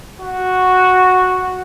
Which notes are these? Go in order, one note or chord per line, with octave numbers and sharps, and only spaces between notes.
F#4